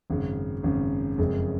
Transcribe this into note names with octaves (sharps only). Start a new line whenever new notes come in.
G#1 F#2 C#3
G#1 F#2 C#3
F#1 F2 C#3 G#3